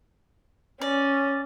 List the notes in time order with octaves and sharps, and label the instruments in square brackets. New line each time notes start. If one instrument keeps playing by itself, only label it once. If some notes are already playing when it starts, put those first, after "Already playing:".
[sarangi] C#4 [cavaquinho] D5